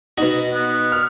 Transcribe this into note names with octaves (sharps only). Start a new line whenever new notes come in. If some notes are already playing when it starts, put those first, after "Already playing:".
B2 D#4 F#4
B3
F6